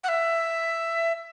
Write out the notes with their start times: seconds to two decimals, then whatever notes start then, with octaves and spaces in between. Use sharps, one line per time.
0.04 F#5
0.09 E5